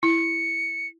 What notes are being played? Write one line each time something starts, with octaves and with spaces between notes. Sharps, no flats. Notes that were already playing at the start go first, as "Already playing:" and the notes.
E4 C#7